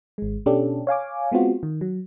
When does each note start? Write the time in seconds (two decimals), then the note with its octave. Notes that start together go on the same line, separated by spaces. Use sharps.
0.18 G#1 G#3
0.46 B2 C#4 D4 G4 A4
0.87 C#5 F5 G#5 D6
1.32 G#3 B3 C4 F4 F#4
1.63 D#3
1.81 F#3